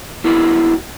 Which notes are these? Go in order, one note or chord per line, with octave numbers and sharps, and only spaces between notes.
B3 E4 F#4 A#4